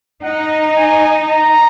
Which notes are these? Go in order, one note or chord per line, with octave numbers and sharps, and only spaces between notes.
D#4 F#5
G#5
A#5